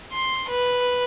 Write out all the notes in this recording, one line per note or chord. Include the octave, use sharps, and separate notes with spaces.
C6
B4